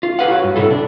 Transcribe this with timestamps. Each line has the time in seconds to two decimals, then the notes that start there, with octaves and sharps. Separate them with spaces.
0.03 F4
0.19 E4 G4 B4 F5 F#5
0.31 F#4 C#5
0.44 G2
0.56 C3 E4 A4
0.70 D4